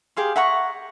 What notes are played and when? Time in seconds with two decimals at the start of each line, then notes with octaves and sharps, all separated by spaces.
0.17 G4 G#4 F5 C6
0.36 E5 F#5 A#5 C#6